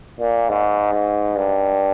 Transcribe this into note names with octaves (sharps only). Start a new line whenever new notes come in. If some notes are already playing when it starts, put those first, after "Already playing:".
A#2
G#2
G#2
G2